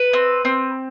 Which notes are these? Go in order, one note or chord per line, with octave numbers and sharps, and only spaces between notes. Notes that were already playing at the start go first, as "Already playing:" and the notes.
Already playing: B4
C4
C4